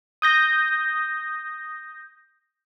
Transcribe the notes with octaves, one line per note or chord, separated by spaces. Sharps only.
D#6 G6 A#6